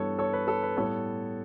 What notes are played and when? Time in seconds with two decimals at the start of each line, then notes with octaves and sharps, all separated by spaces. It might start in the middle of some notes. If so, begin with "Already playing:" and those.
Already playing: G2 E3 G3 B3 A4 C#5
0.19 A4 C#5
0.33 B4
0.48 A4
0.63 B4
0.77 A2 G3 B3 A4 C#5